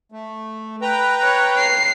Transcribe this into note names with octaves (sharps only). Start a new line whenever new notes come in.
A3
B4 G5 A#5
C#5
C7